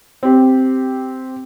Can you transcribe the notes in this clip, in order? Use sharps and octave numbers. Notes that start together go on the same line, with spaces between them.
C4 G4